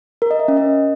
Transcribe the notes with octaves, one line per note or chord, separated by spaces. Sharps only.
A#4
D#5
E5
C#4
D#5